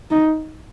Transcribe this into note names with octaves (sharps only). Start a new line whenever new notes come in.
D#4